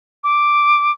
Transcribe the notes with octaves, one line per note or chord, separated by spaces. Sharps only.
D6